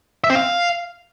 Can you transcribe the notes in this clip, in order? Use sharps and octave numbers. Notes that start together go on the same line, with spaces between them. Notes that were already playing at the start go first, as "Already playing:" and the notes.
E5
C4
F5